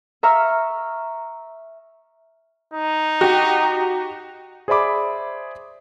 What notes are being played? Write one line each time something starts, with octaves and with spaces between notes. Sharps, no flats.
E5 A#5 C#6 E6 F6
D#4
F#4 G4
G#4 C5 D5 E5 B5 D6